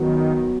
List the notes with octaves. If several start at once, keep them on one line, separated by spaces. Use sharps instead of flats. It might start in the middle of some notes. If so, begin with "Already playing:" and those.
Already playing: D#3 F#3 B3 F#4